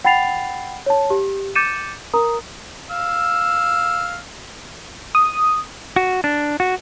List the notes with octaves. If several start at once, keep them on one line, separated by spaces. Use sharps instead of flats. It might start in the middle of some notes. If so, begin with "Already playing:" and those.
F#5 G5 B5 A6 C7 F7
C#5 A5
G4
D6 G6 A6 C#7 D#7 E7
A#4 A#5 D#6
F5 E6
D#6
F#4
D4
F#4